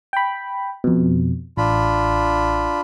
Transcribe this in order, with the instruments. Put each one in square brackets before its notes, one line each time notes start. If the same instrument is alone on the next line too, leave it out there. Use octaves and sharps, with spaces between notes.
[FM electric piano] G5 B5
F2 B2
[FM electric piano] A1 [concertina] D4 F4 B5